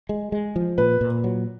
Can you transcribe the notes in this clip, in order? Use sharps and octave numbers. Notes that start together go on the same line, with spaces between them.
G#3
G#3
F3
A#2 B4
A#2
F#3